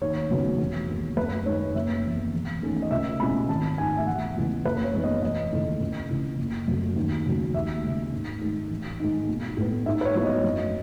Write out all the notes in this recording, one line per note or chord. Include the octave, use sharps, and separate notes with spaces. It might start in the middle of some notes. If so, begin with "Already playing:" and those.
D#2 C#5
C#3 F#3 B3 D#4
E1
D#2 D#3
F#2 B4
D#3 G#3 C#5
F#1 E5
E2 D#3
E1
E2 D#3 A3 C#4
D#5
C#2 E5
B2 G#3 C#4 E4 B5
G#1 A5
G#2 D#3 G#5
E5
E1 F#5
E2 C#3 E3 G#3
F#1 B4
C#5
E2 D#3 G#3 B3
D#5
E1 D#5
D#2 C#3 E3 A3
C#2
C#3 E3
F#1
F#2 C#3 F#3 A3
D#2
C#3 F#3
D#2 E5
C#3 G#3
G#2
D#3 G#3
A1
G#2 D#3 G#3
B1
A2 G#3 B3
G#2 E5
B4
C#5
F#3 B3 E4
D#5
F#2